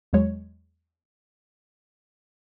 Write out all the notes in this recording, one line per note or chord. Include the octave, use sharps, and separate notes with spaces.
E2 F#3 G#3 C#5